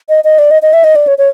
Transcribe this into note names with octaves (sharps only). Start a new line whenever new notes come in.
D#5
D#5
D5
D#5
D#5
E5
D#5
D5
C#5
C#5